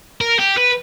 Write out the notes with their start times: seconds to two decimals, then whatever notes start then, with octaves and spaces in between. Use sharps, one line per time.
0.21 A#4
0.39 G4
0.58 B4